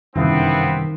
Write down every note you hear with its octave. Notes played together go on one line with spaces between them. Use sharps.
F#1 G2 C3 D#3 E3 B3 C4 E4